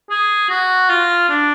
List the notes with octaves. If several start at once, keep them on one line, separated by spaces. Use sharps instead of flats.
G#4
F#4
F4
D4